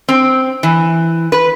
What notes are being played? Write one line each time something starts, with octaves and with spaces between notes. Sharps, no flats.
C4
E3
B4